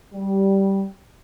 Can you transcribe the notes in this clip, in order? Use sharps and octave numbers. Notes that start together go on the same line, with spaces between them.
G3